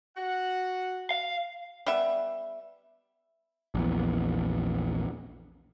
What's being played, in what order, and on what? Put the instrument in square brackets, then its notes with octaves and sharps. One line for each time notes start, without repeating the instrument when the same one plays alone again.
[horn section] F#4 F#5
[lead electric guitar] F5
[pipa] G3 B3 E5
[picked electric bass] A#1 E2